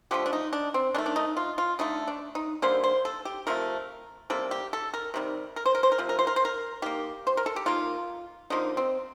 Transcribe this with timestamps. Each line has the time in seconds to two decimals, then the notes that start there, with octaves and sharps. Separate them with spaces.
0.11 D3 F3 A3 G4
0.26 D4
0.33 D#4
0.53 D4
0.74 C4
0.95 D#3 A3 D4
1.06 D4
1.16 D#4
1.37 F4
1.58 F4
1.79 D3 A3 D#4
2.08 D4
2.35 D#4
2.62 D3 G3 A#3 C5
2.84 C5
3.05 A4
3.25 G4
3.47 C3 F3 A3 A#4
4.30 C3 G3 A#3 A4
4.51 G4
4.73 A4
4.94 A#4
5.14 C3 D#3 G3
5.56 A#4
5.66 C5
5.75 A#4
5.83 C5
5.92 A#4
5.98 C3 F3
6.09 A#4
6.19 C5
6.27 A#4
6.36 C5
6.45 A#4
6.82 D#3 A#3 G4
7.27 C5
7.37 A#4
7.46 A4
7.56 G4
7.66 D#3 A#3 F4
8.50 D3 F3 A#3 D#4
8.77 C4